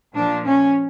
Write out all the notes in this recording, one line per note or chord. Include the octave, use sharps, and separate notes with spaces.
A#2 F3 D4
C#4